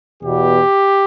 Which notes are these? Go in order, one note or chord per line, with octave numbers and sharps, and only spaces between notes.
E2 B2 B3 G4